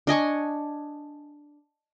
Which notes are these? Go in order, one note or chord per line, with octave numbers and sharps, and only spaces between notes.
D4 D#5 G#5 C#6